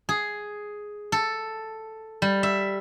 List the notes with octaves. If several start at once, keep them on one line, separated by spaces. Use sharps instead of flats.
G#4
A4
G3
E5